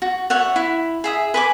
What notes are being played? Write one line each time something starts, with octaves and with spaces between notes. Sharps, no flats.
F#4
C#5 E5 F#5
E4
G#4 E5 D#6
B4 G#5 D6